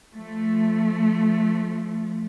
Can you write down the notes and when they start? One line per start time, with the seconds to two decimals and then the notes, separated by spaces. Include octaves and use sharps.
0.15 F3 A3